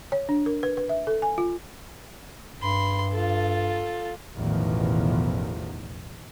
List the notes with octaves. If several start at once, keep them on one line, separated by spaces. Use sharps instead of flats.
C#5
D4
A#4
B4
B4
E5
A4
G#5
F4
G2 B5 C6
F4 A4
A1 E2 B2 D#3 F3